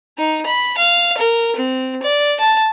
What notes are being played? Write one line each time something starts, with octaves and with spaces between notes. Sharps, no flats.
D#4
B5
F5
A#4
C4
D5
A5